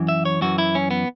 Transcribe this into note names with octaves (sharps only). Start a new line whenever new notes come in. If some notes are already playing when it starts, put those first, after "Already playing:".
Already playing: F#2 E3
E5
C#5
F#2 E3 F#4
E4
C#4
B3